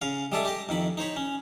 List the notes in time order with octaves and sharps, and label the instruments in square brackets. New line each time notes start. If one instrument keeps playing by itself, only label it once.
[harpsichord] C#3 F5
G3 G#3 G#4 A4 D5 E5
G4 D#5
F2 D#3 B5
D#4 C5 C#5 B5
C#4